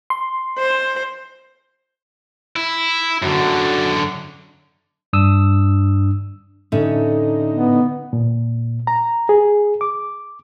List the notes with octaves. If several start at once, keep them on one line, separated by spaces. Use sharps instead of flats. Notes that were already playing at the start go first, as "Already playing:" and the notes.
C6
C5
E4
F#2 D3 F#4
G2 D4 D#6 E6
A2 D3 A3 C#4 D#4
B3
A#2
A#5
G#4
D6